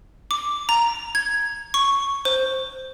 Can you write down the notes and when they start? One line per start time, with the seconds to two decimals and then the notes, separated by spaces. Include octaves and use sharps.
0.31 D6
0.69 A#5
1.15 G#6
1.74 C#6
2.25 C5